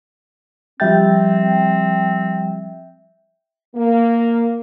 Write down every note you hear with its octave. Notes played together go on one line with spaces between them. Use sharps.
F3 G3 C4 E5 G5 G6 A6
A#3